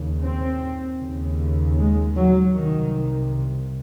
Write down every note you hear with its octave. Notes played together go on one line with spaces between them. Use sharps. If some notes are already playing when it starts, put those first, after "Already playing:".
Already playing: D#2 C#3
C4
D#2 C#3
G#3
F#3
C2 C3 D#3